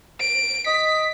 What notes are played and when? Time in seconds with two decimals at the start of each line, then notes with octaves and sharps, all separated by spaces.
0.21 D7
0.66 D#5 B6